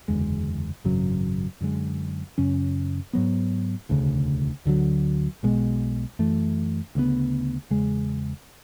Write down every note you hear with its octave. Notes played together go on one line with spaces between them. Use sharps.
F#1 E2 D3 G#3
G#1 F#2 C#3 F#3
F#2 D3 G#3
F#2 C#3 F#3 C#4
G#2 F#3 B3
E1 D2 C#3
D2 D3 F#3
B1 B2 G#3
F#2 E3 A3
D2 C#3 G#3 B3
E2 C#3 G#3